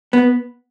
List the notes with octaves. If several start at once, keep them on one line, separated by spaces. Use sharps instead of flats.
B3